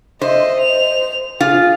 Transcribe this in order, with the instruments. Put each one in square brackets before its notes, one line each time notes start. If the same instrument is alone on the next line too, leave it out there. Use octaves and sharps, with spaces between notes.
[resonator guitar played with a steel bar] C5 [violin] D#5 E5
[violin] F7
[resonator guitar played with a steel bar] F4 [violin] G#4